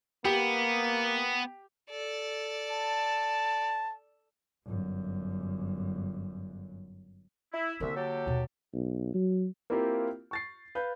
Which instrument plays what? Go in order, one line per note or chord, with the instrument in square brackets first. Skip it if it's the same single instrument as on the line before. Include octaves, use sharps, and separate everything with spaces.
[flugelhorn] A#3 [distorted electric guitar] B3 [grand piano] G4
[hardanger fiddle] A4 D5
[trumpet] A5
[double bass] G1 F#2
[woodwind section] E4
[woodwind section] C2 E5 [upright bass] D3 A#3
[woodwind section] F#3 G4 A4
[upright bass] D#2 B2
[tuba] B1
F#3
[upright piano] A#3 C4 E4 F4 G4 A#4
C#6 A6 C7
B4 F5 G6